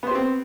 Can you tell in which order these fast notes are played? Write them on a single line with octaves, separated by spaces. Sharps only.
B3 C5 G4 C4